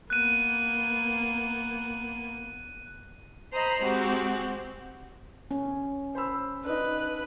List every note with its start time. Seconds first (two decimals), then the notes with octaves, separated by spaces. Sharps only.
0.10 A#3 B3 F#6 D#7
3.52 C5 D#5 A#5 B5
3.83 G#3 C4 F#4 G4
5.51 C#4
6.15 C5 B5 E6
6.65 D4 D#4 B4